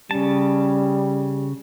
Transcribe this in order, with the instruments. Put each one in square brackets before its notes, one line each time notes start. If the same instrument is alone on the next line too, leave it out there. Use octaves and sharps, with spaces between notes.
[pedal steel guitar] C#3 A5 [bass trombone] G3 [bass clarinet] C#4